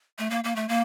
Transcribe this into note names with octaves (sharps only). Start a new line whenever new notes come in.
A3
A#3
A#3
A3
A#3